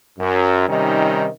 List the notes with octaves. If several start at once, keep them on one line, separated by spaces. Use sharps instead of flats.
F#2
C3 D#3 G3 C#4 D#4